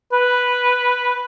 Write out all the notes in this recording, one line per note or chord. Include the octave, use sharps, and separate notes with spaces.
B4